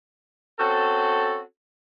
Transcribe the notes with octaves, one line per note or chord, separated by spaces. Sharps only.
C4 C#4 F#4 A4